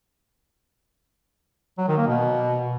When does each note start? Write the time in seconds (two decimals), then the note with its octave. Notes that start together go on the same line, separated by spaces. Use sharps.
1.78 F#3
1.88 D#3
1.97 A#3
2.07 B2